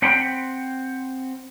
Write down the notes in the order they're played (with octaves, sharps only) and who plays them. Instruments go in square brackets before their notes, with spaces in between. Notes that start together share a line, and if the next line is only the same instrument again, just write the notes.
[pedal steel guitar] C4 C5 F#5 G5 B5